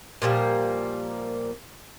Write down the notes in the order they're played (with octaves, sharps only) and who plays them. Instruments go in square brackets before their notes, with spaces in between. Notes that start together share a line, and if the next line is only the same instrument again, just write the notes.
[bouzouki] A#2 F3 G3 A#3